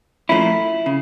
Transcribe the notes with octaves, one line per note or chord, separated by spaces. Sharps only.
A#2 F3 A3 C#4 E4
C#3